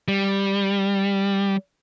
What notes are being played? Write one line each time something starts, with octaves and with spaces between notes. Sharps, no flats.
G3